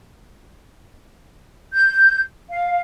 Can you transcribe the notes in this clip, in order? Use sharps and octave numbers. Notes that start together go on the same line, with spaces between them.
G6
F5